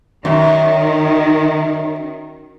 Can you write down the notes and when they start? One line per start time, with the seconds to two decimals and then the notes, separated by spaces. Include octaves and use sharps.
0.25 F#2 D#3